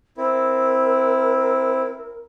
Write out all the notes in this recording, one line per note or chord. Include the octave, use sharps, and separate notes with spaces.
C4 E4 A#4